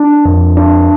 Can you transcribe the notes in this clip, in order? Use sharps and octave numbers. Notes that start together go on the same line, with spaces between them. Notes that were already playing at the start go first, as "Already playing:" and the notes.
Already playing: D4
F2
D4